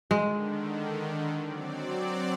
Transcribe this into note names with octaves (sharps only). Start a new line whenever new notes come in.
D3 D#3 G#3
F#3 C4 D5